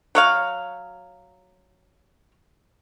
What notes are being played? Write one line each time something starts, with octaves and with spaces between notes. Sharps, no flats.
F#3 C#5 F5